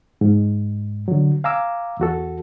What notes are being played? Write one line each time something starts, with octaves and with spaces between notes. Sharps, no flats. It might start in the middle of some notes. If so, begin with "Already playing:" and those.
G#2
D3 F#3
F5 G#5 A#5 D6 E6
E2 F#4 A4